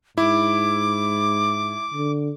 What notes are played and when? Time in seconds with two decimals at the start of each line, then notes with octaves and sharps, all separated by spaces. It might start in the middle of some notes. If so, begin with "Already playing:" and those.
0.18 G#2 E4 D6
1.94 D3